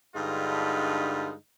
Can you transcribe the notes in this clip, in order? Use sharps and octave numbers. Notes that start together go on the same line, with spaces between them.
G2 D3 G#3 D#4 F4 B4